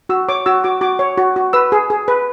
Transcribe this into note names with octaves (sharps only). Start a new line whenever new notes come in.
F#4 E6
C#5 D6
F#4 E6
F#4 D6
F#4 D6
C#5
F#4
F#4
B4 E6
G#4
G#4
B4